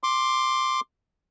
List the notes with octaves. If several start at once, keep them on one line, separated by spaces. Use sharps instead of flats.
C6 D6